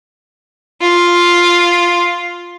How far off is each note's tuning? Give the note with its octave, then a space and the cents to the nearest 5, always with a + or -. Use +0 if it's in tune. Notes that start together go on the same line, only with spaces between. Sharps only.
F4 +0